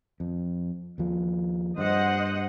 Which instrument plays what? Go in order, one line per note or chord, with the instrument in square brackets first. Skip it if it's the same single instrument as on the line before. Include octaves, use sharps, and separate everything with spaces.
[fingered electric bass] F2
D#2 F3
[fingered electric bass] G2 [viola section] C5 D#5 F#5